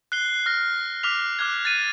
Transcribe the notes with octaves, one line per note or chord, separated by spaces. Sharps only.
F#6 C7 G7
F6 F#6 A#6
D6 F6 B6 F7
D6 F6 F#6 G#6
A6 D#7